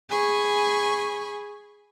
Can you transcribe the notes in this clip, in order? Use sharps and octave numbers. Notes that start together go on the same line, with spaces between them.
G#4 G#5 B5 C#6